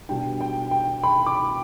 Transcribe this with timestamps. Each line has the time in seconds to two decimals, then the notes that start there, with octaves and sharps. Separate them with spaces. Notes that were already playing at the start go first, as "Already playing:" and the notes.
0.09 B2 G3 D4 G5
0.41 G5
0.71 G5
1.03 B5
1.26 D6